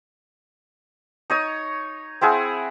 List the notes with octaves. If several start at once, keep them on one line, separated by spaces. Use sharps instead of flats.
D#4 C#5 D#6
C4 E4 G#4 F#5